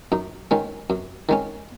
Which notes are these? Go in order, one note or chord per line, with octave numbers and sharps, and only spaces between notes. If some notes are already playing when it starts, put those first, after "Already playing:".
F#2 D#4
D#3 G#3 C#4
F#2
D#3 G#3 C#4